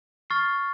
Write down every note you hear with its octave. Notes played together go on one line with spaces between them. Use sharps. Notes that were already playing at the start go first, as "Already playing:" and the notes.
C#6 F6 A6 C7